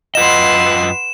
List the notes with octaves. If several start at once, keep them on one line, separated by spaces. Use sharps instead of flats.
F#2 F4 B4 D#5 F#5 C6 E7